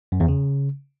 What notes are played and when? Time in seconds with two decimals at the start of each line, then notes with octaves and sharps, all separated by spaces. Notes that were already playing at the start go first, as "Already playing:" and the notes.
0.12 F#2
0.20 E2
0.28 C#3